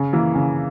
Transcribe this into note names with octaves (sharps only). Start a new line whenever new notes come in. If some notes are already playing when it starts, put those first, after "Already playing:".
Already playing: C#3
E3 A#3
C#3